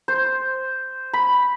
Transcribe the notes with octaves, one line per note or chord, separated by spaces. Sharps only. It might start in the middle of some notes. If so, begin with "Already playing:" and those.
C5
B5